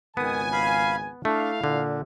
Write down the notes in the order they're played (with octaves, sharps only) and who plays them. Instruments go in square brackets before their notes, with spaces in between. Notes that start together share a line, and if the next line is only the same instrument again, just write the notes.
[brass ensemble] G#1 C#2 G#5 [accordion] D#3 D#6 [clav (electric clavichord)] B3
[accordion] F5 B5
[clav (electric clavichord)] A3 [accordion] D4 [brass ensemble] E4 F5
[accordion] A#2 [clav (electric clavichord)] D3